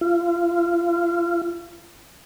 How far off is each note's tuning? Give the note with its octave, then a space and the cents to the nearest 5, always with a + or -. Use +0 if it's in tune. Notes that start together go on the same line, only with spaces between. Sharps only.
F4 -30